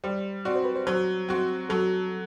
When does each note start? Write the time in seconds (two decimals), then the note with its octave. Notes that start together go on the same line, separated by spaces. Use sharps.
0.04 G3 C5
0.45 C4 F#4 D5
0.56 C5
0.65 B4
0.76 C5
0.86 F#3 C5
1.29 C4 F#4
1.69 F#3 A4